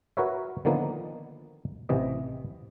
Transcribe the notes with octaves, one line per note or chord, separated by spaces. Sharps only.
F#4 A#4 B4 C#5 E5
D3 D#3 F3 A#3 B3 D#4
A1 C3 E3 D#5